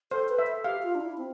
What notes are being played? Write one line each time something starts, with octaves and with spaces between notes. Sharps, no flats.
A4 C5
B4
E5
A4
G4 F5
F4
D4
E4
C4